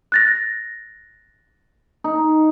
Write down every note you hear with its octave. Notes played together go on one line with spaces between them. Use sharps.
F#6 A6 A#6
D#4